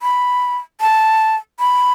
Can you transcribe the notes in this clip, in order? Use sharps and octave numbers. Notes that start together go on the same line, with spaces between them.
B5
A5
B5